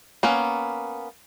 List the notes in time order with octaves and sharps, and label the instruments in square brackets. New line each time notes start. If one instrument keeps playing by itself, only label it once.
[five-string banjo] A#3 B3 C#4